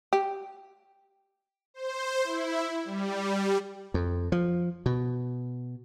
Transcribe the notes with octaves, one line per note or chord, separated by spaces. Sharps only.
G4
C5
E4
G3
F2
F3
B2